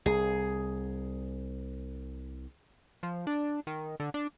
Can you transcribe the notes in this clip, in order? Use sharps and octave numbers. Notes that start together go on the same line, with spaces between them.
C2 G#4
F3
D4
D#3
D3
D4